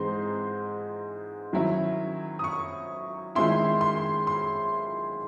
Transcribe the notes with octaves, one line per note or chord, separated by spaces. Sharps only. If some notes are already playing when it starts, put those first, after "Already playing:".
Already playing: G#2 E3 G#3 C4 D#4 C6
D#3 F#3 C#4 E4
D#6
C#6
D#3 G#3 C#4 E4 C6
C6
C6